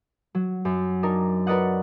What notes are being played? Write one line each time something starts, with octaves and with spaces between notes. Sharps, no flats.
F#3
F#2
D4 D#4 A#4
F#4 A#4 B4 D5 D#5 F#5